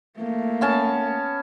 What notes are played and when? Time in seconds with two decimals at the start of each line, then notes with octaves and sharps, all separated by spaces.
0.19 A3 A#3
0.61 B3 C#4 A5